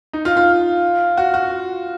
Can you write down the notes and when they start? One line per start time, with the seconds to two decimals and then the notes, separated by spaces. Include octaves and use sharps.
0.13 D#4
0.25 F4
0.37 F4
1.18 F#4
1.34 F#4